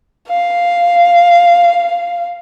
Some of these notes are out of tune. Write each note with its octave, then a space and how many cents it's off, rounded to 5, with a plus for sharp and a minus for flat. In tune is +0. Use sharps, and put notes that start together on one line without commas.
F5 -5